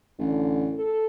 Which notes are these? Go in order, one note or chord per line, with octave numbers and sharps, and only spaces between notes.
A1 D3
A4